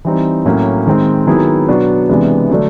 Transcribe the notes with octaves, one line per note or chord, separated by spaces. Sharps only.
E3 G3 C4 D#4
A2 F#3 A#3 C#4 F#4
D#3 G#3 C4
D#3 F#3 B3 E4 G#4
B2 F#3 B3 D4 F#4
C3 E3 G#3 B3 D4
D3 F#3 A3 D4